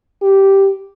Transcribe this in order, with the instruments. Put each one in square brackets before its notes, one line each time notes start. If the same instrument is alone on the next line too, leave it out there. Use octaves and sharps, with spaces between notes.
[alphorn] G4